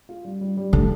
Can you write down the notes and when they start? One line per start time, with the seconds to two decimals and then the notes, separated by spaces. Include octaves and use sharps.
0.09 F4
0.25 G3
0.41 G3
0.57 G3
0.73 D3 A3